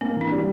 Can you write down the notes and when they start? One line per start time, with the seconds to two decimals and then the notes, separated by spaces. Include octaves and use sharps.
0.01 A#3 C4
0.16 E3 D4
0.31 G3